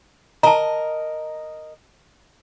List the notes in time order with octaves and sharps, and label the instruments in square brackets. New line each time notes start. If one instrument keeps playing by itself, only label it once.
[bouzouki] A#4 D#5 [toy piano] A5 A#5